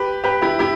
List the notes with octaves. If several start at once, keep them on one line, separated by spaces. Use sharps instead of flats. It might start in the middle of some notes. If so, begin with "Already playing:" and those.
Already playing: G4 B4
G4 B4
E4 G4
E4 G4